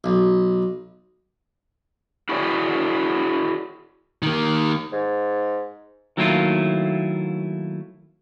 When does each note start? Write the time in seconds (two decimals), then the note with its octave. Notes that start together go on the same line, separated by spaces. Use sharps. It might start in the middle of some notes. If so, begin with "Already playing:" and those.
0.04 B1
2.29 E4 F#4 G#4 C#5 D5
4.22 D#3 A#3
4.92 G#2
6.17 D#3 F#3 A3 A#3 E4 F4